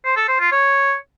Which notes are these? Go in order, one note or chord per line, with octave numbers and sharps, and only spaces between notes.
C5
A4
C5
F4
C#5